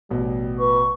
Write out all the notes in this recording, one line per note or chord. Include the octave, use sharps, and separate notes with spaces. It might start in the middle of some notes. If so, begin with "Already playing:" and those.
A1 B2 G3
B4 C#6